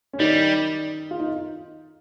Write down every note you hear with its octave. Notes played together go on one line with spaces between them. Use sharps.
C#4
D#3 G3 D#4
F4
D#4